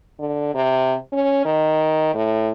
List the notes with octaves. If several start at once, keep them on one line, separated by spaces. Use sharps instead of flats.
D3
C3
C#4
D#3
A2